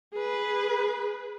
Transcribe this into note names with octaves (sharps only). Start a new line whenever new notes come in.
G#4 B4